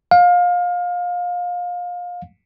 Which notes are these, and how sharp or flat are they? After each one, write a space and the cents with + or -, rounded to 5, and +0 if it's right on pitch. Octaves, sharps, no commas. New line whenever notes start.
F5 +25